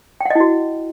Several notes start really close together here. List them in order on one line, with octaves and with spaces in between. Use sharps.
G5 F#5 D#5 E4 F#4